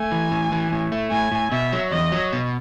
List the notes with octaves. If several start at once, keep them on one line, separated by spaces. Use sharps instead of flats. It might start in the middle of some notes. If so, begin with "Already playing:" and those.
Already playing: A3 G#5
E3
A2
E3
A2
A3
A2 G#5
A2
B2 E5
F#3
E2 D#5
F#3
B2